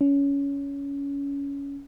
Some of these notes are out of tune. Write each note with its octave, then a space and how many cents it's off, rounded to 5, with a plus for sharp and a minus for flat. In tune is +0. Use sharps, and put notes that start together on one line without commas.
C#4 +20